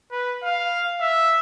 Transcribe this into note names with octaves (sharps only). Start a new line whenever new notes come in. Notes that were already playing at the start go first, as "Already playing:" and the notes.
B4
F5
E5